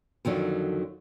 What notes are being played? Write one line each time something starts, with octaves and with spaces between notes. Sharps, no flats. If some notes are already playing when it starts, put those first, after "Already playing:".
F2 D3 D#3 F#3